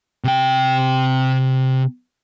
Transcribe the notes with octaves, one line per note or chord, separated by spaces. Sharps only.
C3 G5